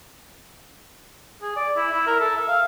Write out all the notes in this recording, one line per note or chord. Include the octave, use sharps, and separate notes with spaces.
G#4
D5
E4
E4
A#4
A4
E5
F5